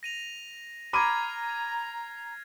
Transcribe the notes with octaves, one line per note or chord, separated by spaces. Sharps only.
A#6 D#7 F7
A#5 B5 D6 F6 G#6 C7 D#7